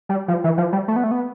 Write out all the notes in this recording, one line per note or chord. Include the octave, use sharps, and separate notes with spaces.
G3
F3
E3
F3
G3
A3
B3
A3
B3